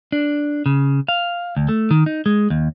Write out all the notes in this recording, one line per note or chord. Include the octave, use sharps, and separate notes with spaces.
D4
C#3
F5
D2
A3
D#3
D#4
G#3
D#2